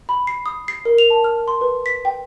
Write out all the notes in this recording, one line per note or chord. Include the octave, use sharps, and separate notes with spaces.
B5
C7
D#6
C7
A#4
F7
A5
F6
C6
B4
B6
G5